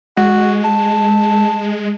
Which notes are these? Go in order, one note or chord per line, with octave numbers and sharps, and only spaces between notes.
G#3 F#4
A5